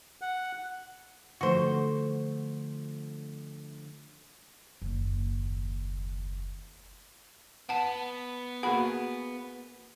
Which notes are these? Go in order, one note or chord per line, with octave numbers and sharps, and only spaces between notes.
F#5
D3 F3 A3 F#4 C5
F#1 D#2
B3 F#5 A5
A#3 F#4 G#4 F#5 B5